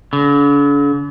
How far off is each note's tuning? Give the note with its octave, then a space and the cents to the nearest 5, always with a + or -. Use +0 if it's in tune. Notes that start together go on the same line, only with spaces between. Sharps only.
D3 -45